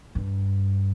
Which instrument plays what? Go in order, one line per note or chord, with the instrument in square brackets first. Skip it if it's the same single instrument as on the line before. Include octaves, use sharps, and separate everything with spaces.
[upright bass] G2